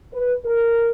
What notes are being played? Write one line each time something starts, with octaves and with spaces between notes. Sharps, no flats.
B4
A#4